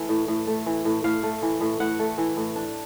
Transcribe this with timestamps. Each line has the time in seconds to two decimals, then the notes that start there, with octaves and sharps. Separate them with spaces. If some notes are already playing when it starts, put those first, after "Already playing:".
Already playing: E3 A3
0.09 A2
0.28 A2
0.47 A3
0.66 E3
0.85 A2
1.04 A2 F5
1.23 A3
1.42 E3
1.61 A2
1.80 A2 F#5
1.99 A3
2.18 E3
2.37 A2
2.56 D4